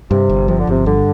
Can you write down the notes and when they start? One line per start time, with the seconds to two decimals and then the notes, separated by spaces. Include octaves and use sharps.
0.10 G2 C3
0.30 G1
0.48 C3 F3
0.59 D3
0.67 G1 C3
0.86 G2 D3